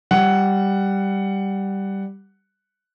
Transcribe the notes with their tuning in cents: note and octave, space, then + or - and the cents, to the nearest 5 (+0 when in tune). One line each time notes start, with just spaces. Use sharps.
G3 +0 F#5 +5